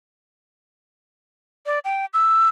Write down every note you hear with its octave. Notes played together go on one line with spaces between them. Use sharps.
D5
G5
E6